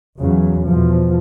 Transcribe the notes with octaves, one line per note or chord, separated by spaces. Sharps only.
E2 C#3 F#3
E2 B2 F3